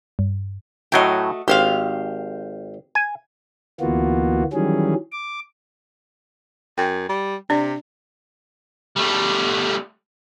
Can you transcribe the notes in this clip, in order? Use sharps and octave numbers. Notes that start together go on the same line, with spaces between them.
G2
A2 F#3 A3 F#4 D#5 G5
G#1 G4 C5 F5
G#5
D2 E3 A#3 B3 F4 F#4
D#3 E3 F#3 G3 C#4 G#4
D6
F#2 G5
G3
C3 D4 D5
G3 A3